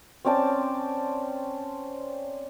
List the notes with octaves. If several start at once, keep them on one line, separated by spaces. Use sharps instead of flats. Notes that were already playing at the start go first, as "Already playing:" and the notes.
C4 C#4 D5 A5